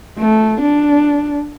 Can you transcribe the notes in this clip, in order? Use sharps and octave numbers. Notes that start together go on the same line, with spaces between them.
A3
D4